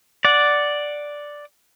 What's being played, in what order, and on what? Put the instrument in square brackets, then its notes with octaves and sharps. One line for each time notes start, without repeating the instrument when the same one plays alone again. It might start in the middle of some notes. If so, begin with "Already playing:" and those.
[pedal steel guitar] D5 F#5